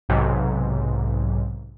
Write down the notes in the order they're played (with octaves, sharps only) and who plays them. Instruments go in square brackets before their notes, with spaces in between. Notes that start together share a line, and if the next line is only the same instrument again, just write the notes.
[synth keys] B1 G#2 C3 F#3